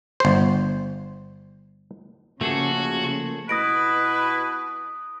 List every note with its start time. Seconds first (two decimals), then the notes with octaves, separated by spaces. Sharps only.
0.20 G1 C5
2.41 C#3 F3 A3 A#3 F#4 G#4 A4
3.49 B2 E4 B4 D#6 A#6 D7